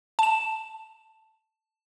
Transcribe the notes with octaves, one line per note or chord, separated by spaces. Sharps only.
A5 E7